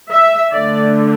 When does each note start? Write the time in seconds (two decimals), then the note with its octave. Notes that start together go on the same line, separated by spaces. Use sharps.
0.11 E5
0.51 D3 A3 D4 D5